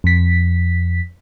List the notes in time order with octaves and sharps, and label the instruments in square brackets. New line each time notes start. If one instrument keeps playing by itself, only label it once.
[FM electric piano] F2 B6